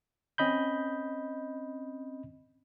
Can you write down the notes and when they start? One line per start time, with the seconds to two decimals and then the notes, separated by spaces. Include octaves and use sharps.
0.38 C4 C#4 D#5 B5 G6